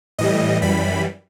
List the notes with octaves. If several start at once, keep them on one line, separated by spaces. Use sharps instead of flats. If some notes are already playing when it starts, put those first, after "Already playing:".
A2 E3 G3 D#5
F#2 E3 G3 B5